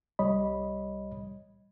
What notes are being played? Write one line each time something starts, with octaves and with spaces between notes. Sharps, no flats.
C2 G3 C#5 D#5 B5